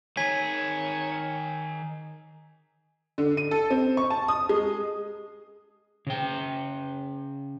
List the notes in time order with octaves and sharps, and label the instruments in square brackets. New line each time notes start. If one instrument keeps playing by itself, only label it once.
[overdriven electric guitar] D#3 G#4 [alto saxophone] C#5 [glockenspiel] G#5 G#6 B6
[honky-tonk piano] D3
D#7
A4
C4
C#6
A5
D#6
G#3
[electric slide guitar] C#3 G5